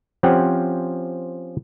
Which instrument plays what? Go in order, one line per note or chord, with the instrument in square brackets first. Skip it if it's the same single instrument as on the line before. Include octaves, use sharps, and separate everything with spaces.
[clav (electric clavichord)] F3 C4 C#4 G4 F#5